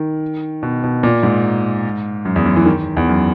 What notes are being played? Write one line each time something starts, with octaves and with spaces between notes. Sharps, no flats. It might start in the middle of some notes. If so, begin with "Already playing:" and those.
Already playing: D#3
B2
B2
A#2
G#2
F#2
E2
F#2
E3
D#3
E2
F#2